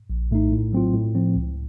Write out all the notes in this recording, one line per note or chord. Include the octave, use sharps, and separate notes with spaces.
A#1
A2 A3 D#4
A2
F#3 C4 F4
A2
F3 C4
C#2